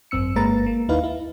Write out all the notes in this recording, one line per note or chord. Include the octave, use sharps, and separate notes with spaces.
G#1 F#2 C4 E6 C#7
G1 G#3 A#3 B4 A#5 A6
A#3
D#2 D#4 E4 B4 F5
E4